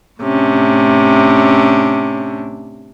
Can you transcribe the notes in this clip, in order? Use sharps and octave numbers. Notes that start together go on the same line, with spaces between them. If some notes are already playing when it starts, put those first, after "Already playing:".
A2 C3 C#4 D4